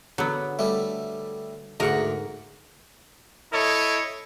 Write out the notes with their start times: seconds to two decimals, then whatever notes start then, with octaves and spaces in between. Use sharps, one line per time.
0.18 D3 F#3 B3
0.59 G3 A3
1.80 D2 G#2 A#4 F#5 C#6
3.52 E4 A4 C#5 D#5